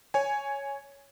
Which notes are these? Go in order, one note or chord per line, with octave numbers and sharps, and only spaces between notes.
C#5 G#5